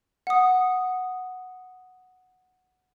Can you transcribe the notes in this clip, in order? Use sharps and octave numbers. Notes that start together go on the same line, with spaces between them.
F#5 D#6